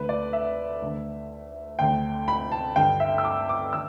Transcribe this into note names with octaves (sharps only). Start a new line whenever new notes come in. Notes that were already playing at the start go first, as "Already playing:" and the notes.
Already playing: D2 D3 B4
D5
E5
D2 D3
D2 D3 G5
B5
A5
G2 D3 G5
E5
E6
D6
D6
D3 E6